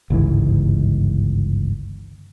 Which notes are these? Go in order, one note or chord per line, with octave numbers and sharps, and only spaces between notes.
G1 C#2 G#2 E3